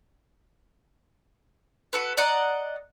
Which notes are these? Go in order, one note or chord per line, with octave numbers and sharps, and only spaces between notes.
F#4 A4 B4
D5 D#5 F#5 A#5